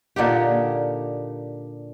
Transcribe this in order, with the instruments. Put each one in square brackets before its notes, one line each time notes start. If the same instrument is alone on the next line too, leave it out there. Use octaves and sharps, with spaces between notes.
[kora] A#2 D3 D#4 G4